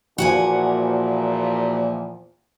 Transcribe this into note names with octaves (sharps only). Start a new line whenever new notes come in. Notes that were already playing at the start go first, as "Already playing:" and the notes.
E2 A#2 F3 F#4 F#5 G#5